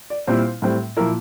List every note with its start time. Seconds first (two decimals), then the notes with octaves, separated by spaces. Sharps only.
0.10 D5
0.27 A#2 G3 C4 E4 C5
0.62 A2 G3 C4
0.97 A#2 F3 A#3 E4 A#4